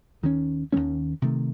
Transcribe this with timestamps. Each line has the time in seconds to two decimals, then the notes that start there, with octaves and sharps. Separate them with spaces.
0.23 D#2 D#3 A3 C#4
0.72 D#2 D#3 A3 C#4
1.22 C3 D#3 A3